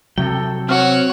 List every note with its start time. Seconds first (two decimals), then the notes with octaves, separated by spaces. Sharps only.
0.18 C3 F#3 A4 G5
0.69 C4 F#4 C#5 F6